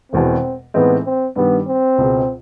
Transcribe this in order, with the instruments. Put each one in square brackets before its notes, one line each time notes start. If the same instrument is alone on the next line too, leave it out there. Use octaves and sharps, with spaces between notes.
[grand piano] E1 E2 B2 [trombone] C4
[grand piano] A2 E3 G#3 C4 D#4 [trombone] B3
[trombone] C4
[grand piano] G2 D#3 G3 [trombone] B3
[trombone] C4
[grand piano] C#2 B2 G#3